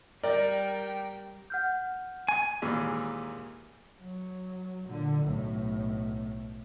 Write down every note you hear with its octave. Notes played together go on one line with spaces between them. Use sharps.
G3 A#4 D5 G5
F#5 F6 G6
G#5
D#2 A#2 E3 G#3
F#3
A#2 D3
B1 A2